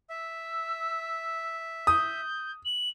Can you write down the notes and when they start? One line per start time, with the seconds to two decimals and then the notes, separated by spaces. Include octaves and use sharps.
0.10 E5 E6
1.87 D#6 G6
2.65 F#7